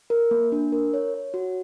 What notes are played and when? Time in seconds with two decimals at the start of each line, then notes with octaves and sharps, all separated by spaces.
0.10 A#4
0.31 A#3
0.52 D4
0.72 A#4
0.94 C#5
1.14 C#5
1.34 F#4